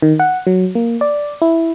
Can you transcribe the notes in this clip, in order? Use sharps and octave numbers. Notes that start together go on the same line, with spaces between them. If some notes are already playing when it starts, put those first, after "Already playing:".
D#3
F#5
F#3
A#3
D5
E4